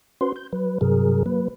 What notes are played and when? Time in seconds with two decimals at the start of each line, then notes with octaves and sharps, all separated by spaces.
0.21 C#4 F#4 B4 C5 C6
0.36 G6
0.53 F#3 B4
0.81 G2 C3 F#3 G#4 A#4
1.26 F#3 A#3 B4